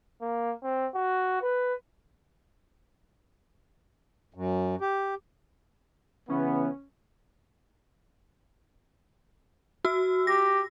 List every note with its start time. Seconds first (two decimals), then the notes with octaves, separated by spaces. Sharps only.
0.21 A#3
0.63 C4
0.95 F#4
1.42 B4
4.34 F#2
4.81 G4
6.29 C#3 E3 B3 C#4
9.85 F#4 E6
10.27 G4 A#6